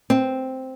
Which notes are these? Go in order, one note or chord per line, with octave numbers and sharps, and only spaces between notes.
C4